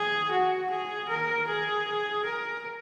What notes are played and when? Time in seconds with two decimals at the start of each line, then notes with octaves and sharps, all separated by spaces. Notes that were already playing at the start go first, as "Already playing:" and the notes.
Already playing: G#4
0.31 F#4
0.70 G#4
1.08 A#4
1.47 G#4
2.25 A#4